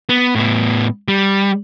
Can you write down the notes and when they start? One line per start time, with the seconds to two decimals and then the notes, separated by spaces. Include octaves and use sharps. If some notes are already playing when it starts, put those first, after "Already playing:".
0.09 B3
0.35 A2 B3
1.08 G3